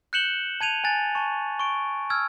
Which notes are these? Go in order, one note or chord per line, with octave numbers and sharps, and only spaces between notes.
F#6 G6 C#7 E7 F#7 G7
A5 G#6 D#7 F7
G#5 F#6 A6
A5 C#6
C#6 D7
E6 F6 G#6